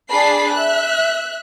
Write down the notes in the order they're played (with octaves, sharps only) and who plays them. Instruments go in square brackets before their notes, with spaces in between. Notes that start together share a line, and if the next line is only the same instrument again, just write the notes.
[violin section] D4 G#4 A5 B5 C7
E5 F#6